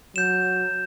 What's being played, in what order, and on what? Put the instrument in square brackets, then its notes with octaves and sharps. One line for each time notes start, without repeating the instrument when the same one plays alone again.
[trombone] F#3 [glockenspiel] G6 E7